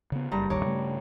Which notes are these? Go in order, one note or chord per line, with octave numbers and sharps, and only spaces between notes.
C#3 B3
F#1 G2 G3 A#5
A1 D#2 C#5 A#5 D6
C#3 G3 A3